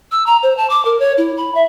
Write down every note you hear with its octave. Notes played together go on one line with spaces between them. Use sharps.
E6
A#5
C5
A5
D6
A#4
C#5
E4
B5
E5